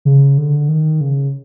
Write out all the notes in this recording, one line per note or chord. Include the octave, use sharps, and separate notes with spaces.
C#3
D3
D#3
C#3